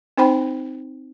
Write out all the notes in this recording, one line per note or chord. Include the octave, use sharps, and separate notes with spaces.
C4 D#4 C5 G5 B5